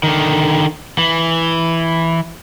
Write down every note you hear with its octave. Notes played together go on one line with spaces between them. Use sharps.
D3 D#3
E3